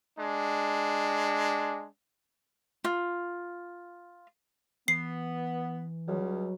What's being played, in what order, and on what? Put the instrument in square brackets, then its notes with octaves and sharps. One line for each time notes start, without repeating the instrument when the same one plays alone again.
[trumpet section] G#3 D4
[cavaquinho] F4
[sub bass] E3 [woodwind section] B3 [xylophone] C7
[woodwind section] C#2 G3 [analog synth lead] F#3